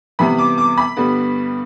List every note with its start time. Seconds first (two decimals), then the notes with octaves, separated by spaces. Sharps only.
0.19 C3 E3 G3 B3 B5
0.38 D6
0.58 D6
0.78 B5
0.96 G2 D3 G3 B3